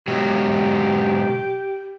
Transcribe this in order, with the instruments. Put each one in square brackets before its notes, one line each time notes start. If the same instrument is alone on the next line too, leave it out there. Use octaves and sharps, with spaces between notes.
[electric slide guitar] B2 F#3 G#3 [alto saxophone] G4